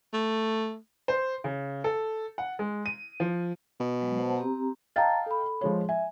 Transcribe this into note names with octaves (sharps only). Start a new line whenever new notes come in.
A3
C5
C#3
A4
F#5
G#3
D#7
F3
B2
F#3 G#3
C5 F#5 A5
C4 G4 A#5
D#5 F5 G5 A5 A#5 A6
A4 B5
F3 G#3 C#5
E5 G#5